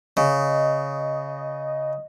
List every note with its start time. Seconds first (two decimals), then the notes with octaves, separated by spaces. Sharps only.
0.17 C#3 D#5